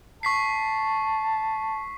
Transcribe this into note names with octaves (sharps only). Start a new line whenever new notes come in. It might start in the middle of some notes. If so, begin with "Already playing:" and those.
A5 C#6 B6 C7